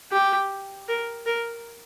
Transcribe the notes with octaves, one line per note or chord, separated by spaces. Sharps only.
G4
A#4
A#4